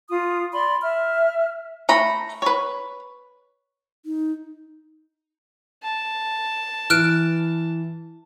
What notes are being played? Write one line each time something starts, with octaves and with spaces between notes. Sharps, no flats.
F4 D#6
D5 B5 C6
E5 F6
A3 A#5 B5
B4 C#5
D#4
A5
E3 F6 F#6 D7